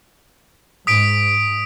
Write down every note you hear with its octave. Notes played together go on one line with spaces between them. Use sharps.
G#2 D#6 B6 D7